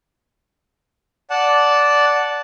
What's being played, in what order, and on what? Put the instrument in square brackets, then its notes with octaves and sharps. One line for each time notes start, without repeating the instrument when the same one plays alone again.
[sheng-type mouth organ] D5 F#5 A5